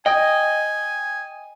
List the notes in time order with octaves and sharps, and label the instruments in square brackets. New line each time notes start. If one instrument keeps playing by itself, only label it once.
[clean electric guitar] D#5 [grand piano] G5 [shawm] G#5